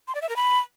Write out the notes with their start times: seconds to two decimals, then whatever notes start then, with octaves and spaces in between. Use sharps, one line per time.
0.08 C6
0.15 D5
0.22 E5
0.29 A#4
0.36 B5